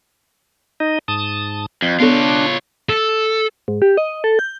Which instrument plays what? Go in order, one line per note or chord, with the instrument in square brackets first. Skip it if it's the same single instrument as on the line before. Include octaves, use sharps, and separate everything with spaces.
[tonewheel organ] D#4 D#5
G#2 A5 D#6
[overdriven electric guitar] F2
[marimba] B3 A4 [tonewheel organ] D4 [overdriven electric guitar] F4 C#5
[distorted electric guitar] A4
[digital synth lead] G#2
G4
D#5
A4
G6